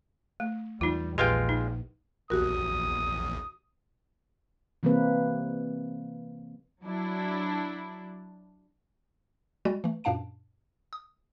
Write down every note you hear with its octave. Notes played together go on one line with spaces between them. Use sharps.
A3
E2 G3 D#4 F4
A#1 G#3 F4 G4 B4 G5 C6
D#4
A#1 E2 F#4 G4 A#4 D#6
C3 E3 G3 A#3 C4 B4
F#3 D4 E4
G3 G#3 F#4 D5
E3 A3
F#2 A#2 D4 F5 A5 D7
D#6